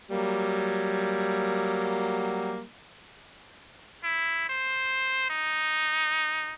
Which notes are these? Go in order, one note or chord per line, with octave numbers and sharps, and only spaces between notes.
F#3 G3 A#3
E4
C5
D#4